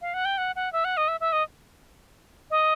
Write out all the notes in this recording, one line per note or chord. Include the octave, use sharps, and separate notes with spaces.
F5
F#5
G5
F#5
F#5
E5
F#5
D#5
E5
E5
D#5
D#5